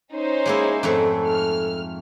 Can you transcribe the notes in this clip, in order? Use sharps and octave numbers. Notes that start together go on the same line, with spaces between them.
C#4 D#4 C5
G#3 A#3 E4 G#4
F2 G#2 A3 A4
F6